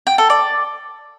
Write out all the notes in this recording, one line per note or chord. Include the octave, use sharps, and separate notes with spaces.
G5
A4
D5